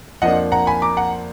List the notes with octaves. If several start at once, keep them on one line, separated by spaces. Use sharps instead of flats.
F2 F3 A#3 D4 D#5 F#5
F#5 A#5
G#5 B5
A#5 D6
F#5 A#5